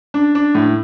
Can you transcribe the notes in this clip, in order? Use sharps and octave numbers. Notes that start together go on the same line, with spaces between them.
D4
D4
A2